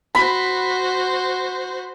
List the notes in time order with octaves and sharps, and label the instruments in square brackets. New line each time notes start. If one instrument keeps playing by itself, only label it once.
[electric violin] F#4 C5 [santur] B5